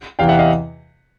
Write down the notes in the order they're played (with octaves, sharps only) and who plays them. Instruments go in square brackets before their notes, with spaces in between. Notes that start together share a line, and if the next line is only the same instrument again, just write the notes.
[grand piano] E2 C3 E3 F5 G5
E5 F#5
D#5 F5